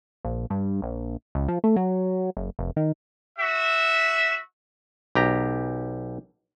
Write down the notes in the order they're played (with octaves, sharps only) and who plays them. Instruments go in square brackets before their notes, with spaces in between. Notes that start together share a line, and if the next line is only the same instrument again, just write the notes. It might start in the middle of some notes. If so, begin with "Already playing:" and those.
[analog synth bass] A#1
G2
A#1
C#2
F3
A3
F#3
F#1
F1
D#3
[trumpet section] F#4 E5
[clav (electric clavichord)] B1 G4 A#5